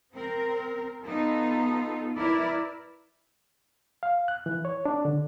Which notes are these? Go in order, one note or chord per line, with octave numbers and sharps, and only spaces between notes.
C4 A#4
B3 D#4 F4 A4
E4 A#4 B4 D5
F5
F#6
E3
C#5
D4
D3